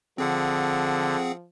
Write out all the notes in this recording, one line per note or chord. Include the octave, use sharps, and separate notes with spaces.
D3 F3 C4 G#4 F#5